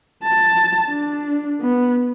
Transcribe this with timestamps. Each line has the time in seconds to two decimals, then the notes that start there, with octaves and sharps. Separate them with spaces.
0.24 A5
0.89 D4
1.61 B3